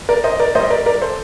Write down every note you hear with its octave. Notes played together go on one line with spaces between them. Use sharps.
A#4 D5
C5 D#5
A#4 D5
A2 G3 C5 D#5
A#4 D5
A#4 D5
A4 C5